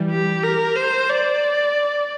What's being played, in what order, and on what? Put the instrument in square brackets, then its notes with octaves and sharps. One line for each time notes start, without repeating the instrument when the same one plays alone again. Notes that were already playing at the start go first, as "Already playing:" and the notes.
Already playing: [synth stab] E3 G3
[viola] G4
A#4
C5
D5